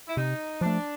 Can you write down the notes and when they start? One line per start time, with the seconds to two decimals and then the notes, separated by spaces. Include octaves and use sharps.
0.08 E4
0.17 C3 D#4
0.61 F3 A3 D4